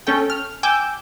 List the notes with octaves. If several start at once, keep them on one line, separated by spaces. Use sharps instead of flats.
C#4 A4 G5
F6
G5 G#5 D6 E6 G6